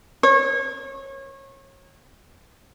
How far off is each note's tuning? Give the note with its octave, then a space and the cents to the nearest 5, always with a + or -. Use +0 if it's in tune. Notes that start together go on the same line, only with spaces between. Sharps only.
C#5 -30